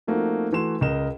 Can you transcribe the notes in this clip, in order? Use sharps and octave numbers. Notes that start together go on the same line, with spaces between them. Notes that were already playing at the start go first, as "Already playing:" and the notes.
F3 A3 A#3 C4 D#4 F#4
E3 A3 F#4 C6 E7
C#2 A#4 D#5 E7